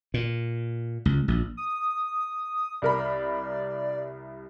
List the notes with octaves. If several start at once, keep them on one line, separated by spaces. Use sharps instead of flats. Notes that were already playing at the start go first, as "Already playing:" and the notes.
A#2
C#2
A#1
D#6
C2 A#4 D5 B5